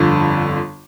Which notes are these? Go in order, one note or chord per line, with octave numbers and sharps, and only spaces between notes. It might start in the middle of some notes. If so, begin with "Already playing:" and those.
Already playing: G1 F2 D3